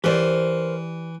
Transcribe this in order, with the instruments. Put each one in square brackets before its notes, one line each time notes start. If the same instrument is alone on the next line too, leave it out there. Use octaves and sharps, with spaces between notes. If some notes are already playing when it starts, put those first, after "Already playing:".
[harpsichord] E3 [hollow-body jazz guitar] G4 D5 [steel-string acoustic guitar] A#4 C5